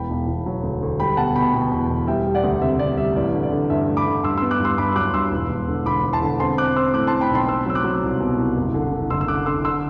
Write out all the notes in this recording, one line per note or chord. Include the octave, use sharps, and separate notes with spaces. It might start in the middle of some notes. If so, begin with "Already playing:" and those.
Already playing: E1 G5 B5
E1
E1
F#3
D2
D2
G3 G5 B5
B2 F#5 A5
B2 G5 B5
B2
E2
E1
G3 E5 G5
G3
D5 F#5
D2
C3 E5
C3 D5
G3 E5
A1 D5
D3
D5
D3
G2 E5
A3
B5 D6
D3
G2 C6 E6
B3 C6 E6
D6 F#6
G2
C6 E6
G2 B5 D6
F#3 D6 F#6
G2 C6 E6
E1
E1
D3
E1 B5 D6
E1
A5 C6
D3
C4 A5 C6
C4 D6 F#6
C4 C6 E6
A2 D6 F#6
A5 C6
A2
G5 B5
B1 A5 C6
C4 C6 E6
F#3 E6
D6 F#6
F#3
C2
B2
C2
F#1
D3
D3
F#1 C6 E6
E6
D3 D6 F#6
D3 C6 E6
D3 C6 E6